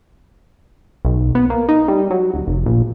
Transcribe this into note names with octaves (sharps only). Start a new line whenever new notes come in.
B1
B3
A#3
D#4
G3
F#3
D1
F1
A#1